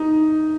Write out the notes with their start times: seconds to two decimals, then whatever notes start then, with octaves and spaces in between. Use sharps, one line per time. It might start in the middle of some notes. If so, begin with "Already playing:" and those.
Already playing: D#4